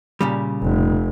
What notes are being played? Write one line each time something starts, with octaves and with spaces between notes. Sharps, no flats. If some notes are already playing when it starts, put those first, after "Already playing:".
A#2 C#3 G3
F1